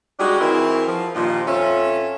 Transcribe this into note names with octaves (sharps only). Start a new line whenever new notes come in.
G3 G#3 D4 D#4 F#4
E3 C4 E4 F#4 G#4 A#4
F3
G2 A#2 D#3 F3
F2 C#4 F4 A4 C#5 E5